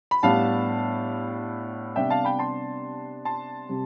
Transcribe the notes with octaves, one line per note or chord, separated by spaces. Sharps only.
B5
A2 G3 B3 D4 F5 A5
C3 G3 B3 D4 E5 G5
F5 A5
G5 B5
A5 C6
A5 C6
C3 G3